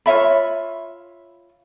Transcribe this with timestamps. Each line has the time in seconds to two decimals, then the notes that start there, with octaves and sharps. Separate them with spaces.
0.06 F4 C#5 E5 B5